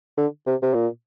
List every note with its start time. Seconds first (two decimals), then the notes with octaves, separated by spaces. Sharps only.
0.17 D3
0.46 C3
0.62 C3
0.74 A#2